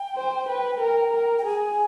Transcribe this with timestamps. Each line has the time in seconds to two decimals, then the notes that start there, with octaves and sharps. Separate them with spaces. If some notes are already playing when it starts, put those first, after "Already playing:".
Already playing: G5
0.16 C5
0.48 B4
0.80 A#4
1.12 A#4
1.38 G5
1.45 G#4 G#5